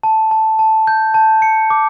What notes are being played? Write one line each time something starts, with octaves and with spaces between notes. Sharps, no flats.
A5
A5
A5
G6
A5
C#7
D6